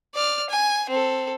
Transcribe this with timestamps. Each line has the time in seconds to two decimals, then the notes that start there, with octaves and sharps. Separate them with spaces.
0.15 D5 F6
0.50 G#5
0.90 C4 A4